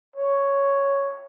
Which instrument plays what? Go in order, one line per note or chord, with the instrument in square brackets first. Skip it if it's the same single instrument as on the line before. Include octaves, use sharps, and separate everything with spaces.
[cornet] C#5